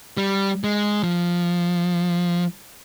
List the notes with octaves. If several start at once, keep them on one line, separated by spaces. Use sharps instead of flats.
G3
G#3
F3